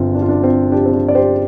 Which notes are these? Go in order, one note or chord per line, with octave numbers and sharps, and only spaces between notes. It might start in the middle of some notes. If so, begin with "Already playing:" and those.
Already playing: G1 C4 F4
D4
F4
D4
C4 F4
D4 G4
C4
D4
D5
G4 C5